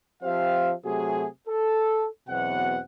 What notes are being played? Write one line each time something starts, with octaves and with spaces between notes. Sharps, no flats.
F3 C4 G4 C5 E5 F5
C3 F#3 A3 F#4 G#4
A4
E2 B2 F#3 C4 F#5